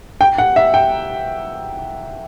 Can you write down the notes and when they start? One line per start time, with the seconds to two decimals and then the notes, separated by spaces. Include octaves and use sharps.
0.21 G5
0.38 F#5
0.56 E5
0.74 G5